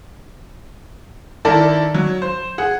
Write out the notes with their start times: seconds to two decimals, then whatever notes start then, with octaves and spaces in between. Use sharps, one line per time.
1.45 D#3 E4 A4 A#4 D5
1.94 F#3
2.22 C5
2.58 G#4 F#5